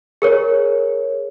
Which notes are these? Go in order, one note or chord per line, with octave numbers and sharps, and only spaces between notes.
G#4 A#4 C#5